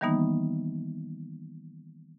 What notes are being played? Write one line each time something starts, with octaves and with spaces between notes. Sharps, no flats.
D#3 E3 G3 A#3 B3 D#4